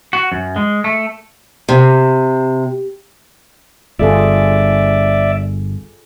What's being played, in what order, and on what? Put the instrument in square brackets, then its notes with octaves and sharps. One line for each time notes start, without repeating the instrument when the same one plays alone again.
[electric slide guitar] F#4
F#2
G#3
A3
[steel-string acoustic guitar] C3
[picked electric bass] G1 [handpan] F4 G#4 A4 [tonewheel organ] D5 E5